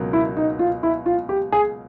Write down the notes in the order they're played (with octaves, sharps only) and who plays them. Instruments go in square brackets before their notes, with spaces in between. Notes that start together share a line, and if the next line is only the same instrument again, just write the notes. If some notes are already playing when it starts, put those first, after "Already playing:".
Already playing: [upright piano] C#2 B2 F#3 A#3
[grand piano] E4
D#4
F4
E4
F4
G4
G#4